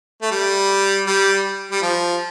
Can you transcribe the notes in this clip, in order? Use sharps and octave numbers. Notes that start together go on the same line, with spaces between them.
A3
G3
G3
G3
F3